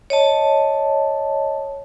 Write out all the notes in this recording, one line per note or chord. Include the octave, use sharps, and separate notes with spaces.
C#5 D#5 A5